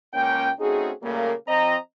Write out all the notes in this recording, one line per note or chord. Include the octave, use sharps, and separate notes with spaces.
C#2 A#3 C#4 G5
A3 C4 C#4 D#4 F#4 G#4
A#2 C#3 G3 A3 A#3
F3 C4 D#5 A#5